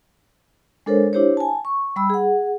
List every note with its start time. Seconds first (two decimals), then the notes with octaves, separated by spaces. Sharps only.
0.86 G#3 D4 A4 A#4 C5 C#5
1.13 D4 E4 G4 C5 C#5
1.37 G#5 A5
1.65 C#6
1.96 G3 B5 E6
2.10 G#4 F#5